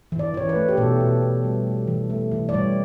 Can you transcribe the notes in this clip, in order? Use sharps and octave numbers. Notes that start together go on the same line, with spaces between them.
E3
D5
E3 C#5
B4
A3
G4
B2 A4
B2
B2
G3
A3
E3
A3
E3
D5
G3 C#5